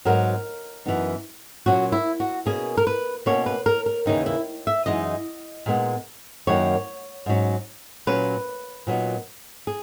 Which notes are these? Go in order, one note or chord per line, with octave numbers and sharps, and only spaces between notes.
G#2 F#3 B3 A#4
F#2 E3 B3 D#4
A#2 F#3 C#4 F#4
E4
F#4
B2 A#3 C#4 G#4
A#4
B4
B2 A#3 C#4 C#5
B4
A#4
A#4
D#2 C#3 E3 A#3 D#4
E4
E5
F#2 E3 G#3 D#4 D#5
A#2 G#3 B3 D#4
F#2 D#3 F#3 A#3 C#5
G#2 F#3 C#4
A#2 F#3 C#4 B4
A#2 F#3 B3 D#4
G#4